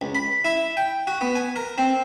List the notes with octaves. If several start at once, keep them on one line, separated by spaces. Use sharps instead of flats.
C#2
B5
E4
G5
F#4
B3
G#5
A#4
C4